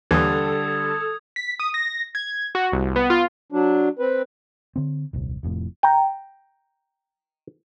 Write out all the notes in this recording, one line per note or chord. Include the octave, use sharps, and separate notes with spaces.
D#2 D3 E3 G3 A4 D#6 G#6
B6
D#6
A#6
G#6
F#4
C2
B3
F4
F#3 D4
C4 B4
D3 C4
D#1 C2
F1 F2 A2
G5 A#5